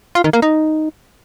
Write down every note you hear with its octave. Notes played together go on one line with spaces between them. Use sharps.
F4
D#3
A#3
D#4